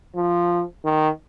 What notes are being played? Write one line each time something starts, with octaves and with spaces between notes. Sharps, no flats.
F3
D#3